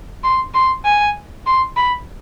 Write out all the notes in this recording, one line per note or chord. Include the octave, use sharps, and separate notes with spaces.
C6
C6
G#5
C6
B5